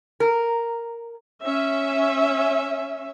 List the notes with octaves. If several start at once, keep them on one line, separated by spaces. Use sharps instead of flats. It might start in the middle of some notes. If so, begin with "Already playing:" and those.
A#4
C#4 E5